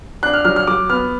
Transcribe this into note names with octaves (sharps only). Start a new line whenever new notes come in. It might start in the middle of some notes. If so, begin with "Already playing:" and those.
D4 F#6
F6
F#3 F6
F6
F#3 D6
B3 F6